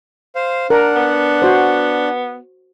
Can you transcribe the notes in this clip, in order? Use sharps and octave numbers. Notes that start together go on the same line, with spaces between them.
C5 F5
D4 A#4 F#5
B3
F#4 C5